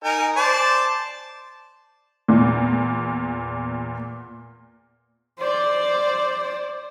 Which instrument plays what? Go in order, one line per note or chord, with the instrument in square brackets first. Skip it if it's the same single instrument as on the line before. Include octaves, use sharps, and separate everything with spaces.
[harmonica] D#4 A#4 G#5
C5 D5 A5
[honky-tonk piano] E2 A#2
[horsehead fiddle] C5 D5